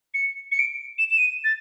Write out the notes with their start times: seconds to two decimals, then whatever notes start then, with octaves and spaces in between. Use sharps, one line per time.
0.14 C#7
0.52 C#7
0.59 D7
0.98 E7
1.11 E7
1.18 D#7
1.44 A6